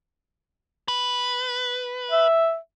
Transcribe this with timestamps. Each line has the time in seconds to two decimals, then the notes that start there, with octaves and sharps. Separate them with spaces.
0.88 B4
2.11 E5